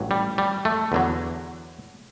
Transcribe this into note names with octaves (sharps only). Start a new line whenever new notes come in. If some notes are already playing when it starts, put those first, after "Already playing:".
Already playing: A1 G2 F#3
G3
G3
A3
E2 D3 F#3